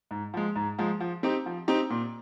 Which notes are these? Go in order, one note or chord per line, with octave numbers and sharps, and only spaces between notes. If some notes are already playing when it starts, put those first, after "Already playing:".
G#2
F3 G#3
G#2
F3 G#3
F3
C4 D#4 G4
F3
C4 D#4 G4
A#2